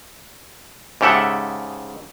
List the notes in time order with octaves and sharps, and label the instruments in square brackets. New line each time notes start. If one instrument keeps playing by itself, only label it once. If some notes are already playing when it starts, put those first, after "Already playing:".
[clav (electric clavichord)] G#2 C#3 G4 A4 E5 F#5